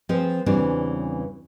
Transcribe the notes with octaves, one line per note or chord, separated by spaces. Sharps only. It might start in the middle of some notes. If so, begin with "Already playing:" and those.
F3 C4 G#4 B4 C5
E2 C#3 E3 G3 C4 D4